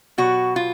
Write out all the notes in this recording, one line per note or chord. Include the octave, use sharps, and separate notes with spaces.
B2 F#3 F#4
F4